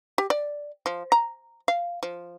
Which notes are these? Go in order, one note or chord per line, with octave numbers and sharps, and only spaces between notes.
G4
D5
F3
A#5
F5
F3